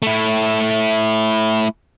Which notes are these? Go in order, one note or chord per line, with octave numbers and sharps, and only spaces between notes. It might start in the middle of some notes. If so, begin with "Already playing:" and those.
A3 E4